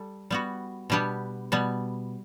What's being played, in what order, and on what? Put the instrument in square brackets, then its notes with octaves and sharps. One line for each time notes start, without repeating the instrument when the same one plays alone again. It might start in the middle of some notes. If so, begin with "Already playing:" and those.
Already playing: [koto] G3 A4
G3 B3 F#4
B2 G3 B3 D4 G4
B2 G3 B3